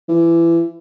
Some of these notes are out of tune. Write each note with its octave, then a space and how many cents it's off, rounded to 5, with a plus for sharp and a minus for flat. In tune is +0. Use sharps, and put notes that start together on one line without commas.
E3 +25